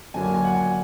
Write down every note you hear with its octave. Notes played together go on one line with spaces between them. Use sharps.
F#2 D3 F#3 A#3 G#5
G#5
G#5
F#5
G#5